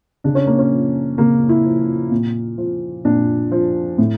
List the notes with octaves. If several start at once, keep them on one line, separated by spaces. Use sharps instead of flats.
C#3 D4
C#4
A#3
C#4
F3
C#3 A#3
E4
F3
F4
A#2
F3
A#2 D4
F3
A2